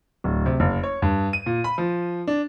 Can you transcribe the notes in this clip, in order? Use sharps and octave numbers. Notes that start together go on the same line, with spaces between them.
D1
C3
F#1
C#5
G2
D#7
A#2
B5
F3
D4